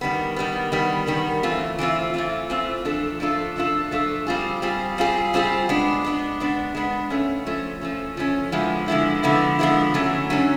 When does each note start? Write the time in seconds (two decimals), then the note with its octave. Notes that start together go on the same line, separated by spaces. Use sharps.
0.01 D#3 G3 B3
0.36 D#3 G3 B3
0.72 D#3 G3 B3
1.07 D#3 G3 B3
1.43 E3 A3 C4 F4
1.79 E3 A3 C4 F4
2.14 E3 A3 C4 F4
2.50 E3 A3 C4 F4
2.85 F3 A3 D4 F4 A4
3.20 F3 A3 D4 F4 A4
3.56 F3 A3 D4 F4 A4
3.91 F3 A3 D4 F4 A4
4.27 G3 C4 F4 G#4
4.62 G3 C4 F4 G#4
4.98 G3 C4 F4 G#4
5.34 G3 C4 F4 G#4
5.69 G#3 B3 D4
6.04 G#3 B3 D4
6.40 G#3 B3 D4
6.75 G#3 B3 D4
7.10 F3 A3 C#4
7.46 F3 A3 C#4
7.81 F3 A3 C#4
8.17 F3 A3 C#4
8.52 D3 F3 G#3 B3 E4
8.88 D3 F3 G#3 B3 E4
9.23 D3 F3 G#3 B3 E4
9.59 D3 F3 G#3 B3 E4
9.94 D3 F#3 A3 C#4
10.30 D3 F#3 A3 C#4